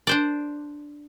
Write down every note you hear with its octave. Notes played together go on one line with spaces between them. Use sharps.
D4 C5 D5